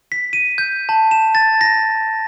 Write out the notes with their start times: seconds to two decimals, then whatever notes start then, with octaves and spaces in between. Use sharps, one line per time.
0.12 B6
0.33 D#7
0.58 G6
0.89 A5
1.11 E7
1.35 A6
1.61 A#6